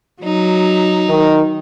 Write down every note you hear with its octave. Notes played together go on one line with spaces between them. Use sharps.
F#3 D#4
D#3